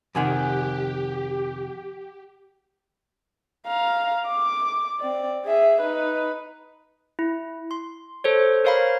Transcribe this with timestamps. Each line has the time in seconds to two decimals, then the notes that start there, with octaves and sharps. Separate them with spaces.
0.15 F2 C3 D#3 G4 F#5 G#5 D6
3.67 F5 A#5
4.27 D6
4.99 C4 D5
5.45 G#4 E5
5.81 D#4 B4
7.19 E4
7.71 C6
8.24 A4 C5 C#5
8.64 A#4 C5 C#5 F5 A#5 B5